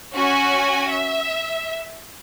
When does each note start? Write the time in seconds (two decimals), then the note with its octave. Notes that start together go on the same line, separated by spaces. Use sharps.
0.13 C#4 F#4 G#5
0.90 E5